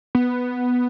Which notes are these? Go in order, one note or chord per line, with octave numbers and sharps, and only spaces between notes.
B3